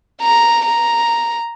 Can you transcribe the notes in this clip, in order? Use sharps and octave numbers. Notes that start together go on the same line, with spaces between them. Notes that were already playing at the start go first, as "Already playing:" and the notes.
A#5
A#5